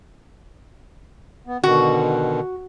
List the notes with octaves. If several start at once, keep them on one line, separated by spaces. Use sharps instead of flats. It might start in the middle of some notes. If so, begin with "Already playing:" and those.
B3
B2 D3 D#3 F#4